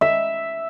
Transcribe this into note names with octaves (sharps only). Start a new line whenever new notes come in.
E5